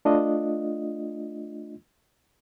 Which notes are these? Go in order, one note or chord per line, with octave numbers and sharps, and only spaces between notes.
A3 D4 F4 D#5